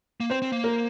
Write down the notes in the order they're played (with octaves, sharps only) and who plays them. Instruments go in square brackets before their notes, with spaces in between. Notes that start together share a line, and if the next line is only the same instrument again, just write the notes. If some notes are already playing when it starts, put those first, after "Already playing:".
[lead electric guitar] A#3
[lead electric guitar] C4 [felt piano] C5
[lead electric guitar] C4
A#3
[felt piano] A#4